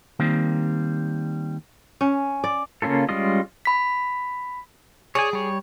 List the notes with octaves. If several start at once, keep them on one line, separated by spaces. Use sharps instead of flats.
D#3 G3 A#3 C4
C#4
D5
C#3 A#3 C#4 F4 A4
G3 G#3 C#4 F4 D#5
B5 B6
G#4 C#5 D5 G#5
G3 C#5